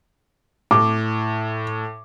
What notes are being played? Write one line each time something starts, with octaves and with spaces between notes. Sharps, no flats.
A2 D6